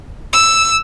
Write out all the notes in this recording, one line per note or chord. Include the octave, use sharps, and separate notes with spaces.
E6